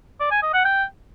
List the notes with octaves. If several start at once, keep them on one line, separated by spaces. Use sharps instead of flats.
D5
G#5
D#5
F#5
G5